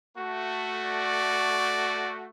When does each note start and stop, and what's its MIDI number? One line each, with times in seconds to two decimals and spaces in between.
0.17 2.28 57
0.17 2.28 66
0.86 2.14 74